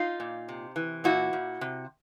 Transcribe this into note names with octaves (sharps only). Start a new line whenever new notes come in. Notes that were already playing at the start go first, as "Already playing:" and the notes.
Already playing: D#4 F4
A#2
C3
E3
A#2 E4 F#4
A#2
C3